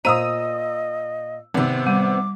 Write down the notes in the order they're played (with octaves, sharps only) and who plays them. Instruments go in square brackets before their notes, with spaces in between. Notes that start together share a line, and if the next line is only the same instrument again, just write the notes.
[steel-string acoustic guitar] A#2 A#5 [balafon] C5 [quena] D#5 [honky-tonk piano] D#6 E6 D#7
[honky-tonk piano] G#1 C3 [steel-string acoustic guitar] B3 C4
[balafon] G3 [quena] D6